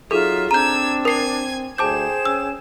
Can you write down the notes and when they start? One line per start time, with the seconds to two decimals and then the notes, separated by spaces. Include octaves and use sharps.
0.11 F#3 D#4 F4 G#4 A4 E5
0.51 C4 D4 A#5 E6 G6 G#6
1.05 A#4 G#5 G#6 C7
1.78 D2 G#4 C5 G5 A5 D6 G6 E7
2.25 C#4 E6